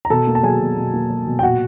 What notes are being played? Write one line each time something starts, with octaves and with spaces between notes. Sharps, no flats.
A#5
B2 A4 A5
A#3
A5
F#3 G#4 G#5
B2
B2
A#3
F#3
B2
G5
A#2 F#4 F#5